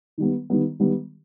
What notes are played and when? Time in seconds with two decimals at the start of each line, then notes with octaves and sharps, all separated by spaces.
0.18 D#3 G3 B3
0.50 D#3 G3 B3
0.80 D#3 G3 B3